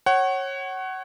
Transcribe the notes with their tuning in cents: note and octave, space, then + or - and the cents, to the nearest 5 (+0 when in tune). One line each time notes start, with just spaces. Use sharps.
C#5 -20 F#5 +25